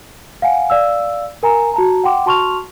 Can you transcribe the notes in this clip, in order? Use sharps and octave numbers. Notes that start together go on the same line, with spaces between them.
F5 F#5 G#5
D5 F5 E6
A#4 G#5 A#5
F#4 A5 A#5
F#5 G5 C6 D6
F#4 A5 C6 C#6 F6 F7